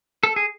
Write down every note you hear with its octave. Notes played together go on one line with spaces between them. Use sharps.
A4
G#4